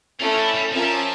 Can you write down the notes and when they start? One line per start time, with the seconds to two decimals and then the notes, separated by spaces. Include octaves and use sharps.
0.20 A3 C#4 E4 F4
0.38 D4
0.55 G3
0.72 F3 C#4 F4 A#4 E5 A5
0.82 G3
0.92 F3